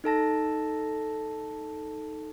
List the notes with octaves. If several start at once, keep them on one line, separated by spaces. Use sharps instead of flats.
D#4 A4 A5 A#6